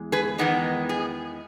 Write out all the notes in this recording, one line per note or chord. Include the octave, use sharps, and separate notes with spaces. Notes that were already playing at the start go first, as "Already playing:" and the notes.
Already playing: E2 G#3
G#4 B4
E2 D#3 G#3 B3 D#4
G#4